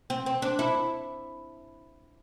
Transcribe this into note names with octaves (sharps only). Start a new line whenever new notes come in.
C4
C4
D4
E4